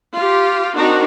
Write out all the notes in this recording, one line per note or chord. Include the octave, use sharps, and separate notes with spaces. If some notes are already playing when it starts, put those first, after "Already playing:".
F4 G4
C4 D4 D#4 F#4 A#4